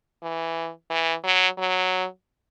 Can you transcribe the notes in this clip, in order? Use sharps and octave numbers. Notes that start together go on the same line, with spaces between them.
E3
E3
F#3
F#3